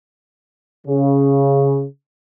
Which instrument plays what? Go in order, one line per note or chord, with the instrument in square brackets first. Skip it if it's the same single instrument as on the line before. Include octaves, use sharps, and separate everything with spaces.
[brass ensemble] C#3